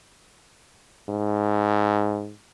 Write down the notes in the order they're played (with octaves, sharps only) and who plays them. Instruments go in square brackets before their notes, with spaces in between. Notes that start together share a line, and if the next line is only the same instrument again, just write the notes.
[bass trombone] G#2